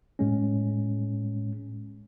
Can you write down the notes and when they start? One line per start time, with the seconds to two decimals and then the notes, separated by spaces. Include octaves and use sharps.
0.19 A2 G#3 C#4